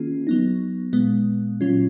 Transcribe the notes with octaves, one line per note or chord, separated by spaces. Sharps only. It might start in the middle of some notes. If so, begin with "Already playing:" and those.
Already playing: D#3 A#3 C#4 F4 G#4
F#3 B3 D#4
A#2 G#3 B3
A#2 F#3 C#4 F4